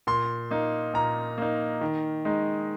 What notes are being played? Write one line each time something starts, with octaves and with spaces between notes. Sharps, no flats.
A#2 C6
A#3 D#4
A#2 A#5
A#3 D#4
D#3
G#3 D#4